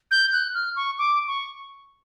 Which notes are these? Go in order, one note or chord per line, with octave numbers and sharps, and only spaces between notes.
G6
F#6
F6
C#6
D6
C#6